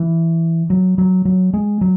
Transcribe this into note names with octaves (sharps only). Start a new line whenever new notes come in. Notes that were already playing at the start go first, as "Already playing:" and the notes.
Already playing: E3
F#3
F#3
F#3
G#3
F#3